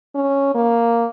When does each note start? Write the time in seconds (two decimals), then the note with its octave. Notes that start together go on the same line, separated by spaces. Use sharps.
0.15 C#4
0.55 A#3